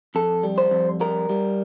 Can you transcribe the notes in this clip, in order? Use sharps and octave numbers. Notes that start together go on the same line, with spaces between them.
F2 A4
G3
C5
F2
G3 A#4
G3